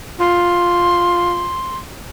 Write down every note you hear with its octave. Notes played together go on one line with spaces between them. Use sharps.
F4 C6